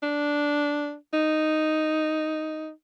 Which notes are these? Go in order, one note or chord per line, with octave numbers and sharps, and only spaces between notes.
D4
D#4